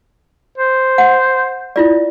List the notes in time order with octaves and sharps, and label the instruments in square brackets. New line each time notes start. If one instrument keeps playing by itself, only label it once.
[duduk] C5
[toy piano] F#5
E4 F4 D5